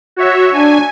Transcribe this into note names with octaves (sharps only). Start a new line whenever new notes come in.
F#4 C#5 E5
D4 G#5